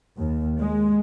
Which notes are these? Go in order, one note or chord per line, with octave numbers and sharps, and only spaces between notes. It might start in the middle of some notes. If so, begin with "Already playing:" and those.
D#2
G#3